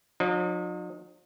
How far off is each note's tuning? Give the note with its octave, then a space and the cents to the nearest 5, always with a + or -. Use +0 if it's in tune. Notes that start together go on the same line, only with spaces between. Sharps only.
F3 +45 D#4 -40